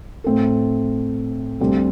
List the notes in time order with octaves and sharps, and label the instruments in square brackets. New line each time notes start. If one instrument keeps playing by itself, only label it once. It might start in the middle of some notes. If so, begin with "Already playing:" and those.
[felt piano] A2 A3 C4 A4
D2 D3 G3 C4